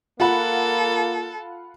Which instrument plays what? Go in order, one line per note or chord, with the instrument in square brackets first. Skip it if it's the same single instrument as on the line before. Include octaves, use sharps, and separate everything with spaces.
[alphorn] A#3 [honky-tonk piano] F4 F#5 B5 [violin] A4